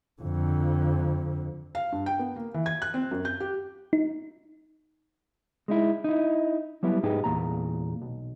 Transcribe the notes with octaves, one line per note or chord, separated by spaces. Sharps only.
F2 D3
F5
G2
G5
B3
A#3
E3
G#6
F#6
C4
F#2
G6
G4
D#4
G#3 D#4 E4
D#4 E4
F#3 G3 B3 E4
G#2 D#4 G4 G#4 B4
E2 A#2 A#5
B1